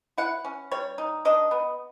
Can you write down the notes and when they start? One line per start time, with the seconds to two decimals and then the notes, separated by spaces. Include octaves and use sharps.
0.18 E4 F#5
0.45 C#4
0.71 G3 C#5
0.98 D#4
1.25 D4 D#5
1.51 B3